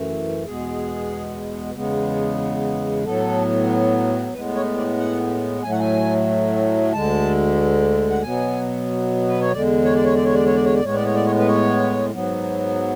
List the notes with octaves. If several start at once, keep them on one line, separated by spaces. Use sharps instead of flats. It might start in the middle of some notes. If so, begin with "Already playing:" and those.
Already playing: F#2 E3 A3
E2 B2 G#3 B3 G#4
E2 C#3 G#3 B3
A2 F#3 B3 A4
A2 G#3 B3 B4
C#5
D5
F#5
A2 F#3 A3 G#5
F#5
G#5
D2 D3 G#3 A5
F#5
B2 F#3 B3 G#5
B4
C#5
E2 D3 G#3 D5
C#5
D5
C#5
D5
C#5
D5
C#5
D5
C#5
D5
A2 G#3 B3 C#5
D5
C#5
D5
C#5
B4
C#5
G#2 F#3 B3